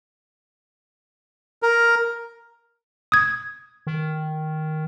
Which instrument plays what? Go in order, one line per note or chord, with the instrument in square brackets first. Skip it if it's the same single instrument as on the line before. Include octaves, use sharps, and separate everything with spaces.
[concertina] A#4
[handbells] D#6 G#6
[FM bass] D#3